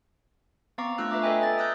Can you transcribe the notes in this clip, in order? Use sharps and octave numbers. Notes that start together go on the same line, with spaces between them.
B3 C4 F5 A#5 C#6 D6
A3 D4 F4 E6 F#6
B4 E5 A#5 D6
A4 B4 D#5 E5 G5 G#5
D#5 A6
D#6 E6 F#6 G6 A6